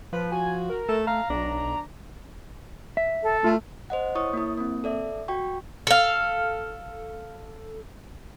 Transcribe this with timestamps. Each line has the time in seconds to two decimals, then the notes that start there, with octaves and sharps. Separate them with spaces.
0.13 F3 B4
0.32 F#4 G#5
0.69 A#4
0.89 A3 A4
1.07 F5 A#5
1.30 B1 D4
2.97 E5
3.23 A4
3.44 A3 F4
3.90 C5 D#5 F#5
4.15 E4 C#5 C#6 D#6
4.33 A#3 E4
4.57 A#3 C4
4.84 A4 D5 E5
5.28 F#4 G5 C#6
5.87 A4 F5